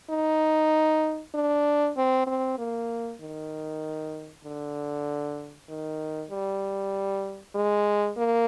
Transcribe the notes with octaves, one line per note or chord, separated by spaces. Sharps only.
D#4
D4
C4
C4
A#3
D#3
D3
D#3
G3
G#3
A#3